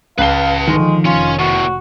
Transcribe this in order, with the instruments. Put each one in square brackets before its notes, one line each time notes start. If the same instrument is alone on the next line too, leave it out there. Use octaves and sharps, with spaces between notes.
[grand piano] C#2 C7 G7 [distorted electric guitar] B4 A5 [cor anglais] F5
[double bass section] D3 F3 [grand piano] D#3 [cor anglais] G#3
[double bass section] F1 [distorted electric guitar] C#4 [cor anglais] F4
[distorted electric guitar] E2 A2 [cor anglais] F#4